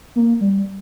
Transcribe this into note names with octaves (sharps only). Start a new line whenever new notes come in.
A#3
G3